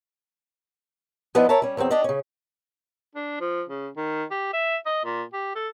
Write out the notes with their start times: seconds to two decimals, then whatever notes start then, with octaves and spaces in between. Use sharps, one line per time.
1.35 F3 B3 D4 E4 B4 D#5
1.49 A#4 C#5 E5 A5
1.62 G3 C#4
1.77 E2 E3 F#3 C4 G5
1.91 D4 G4 D5 D#5
2.04 C#3 C#4
3.15 D4
3.41 F3
3.69 C#3
3.97 D#3
4.31 G4
4.53 E5
4.86 D#5
5.05 A#2
5.33 G4
5.55 A4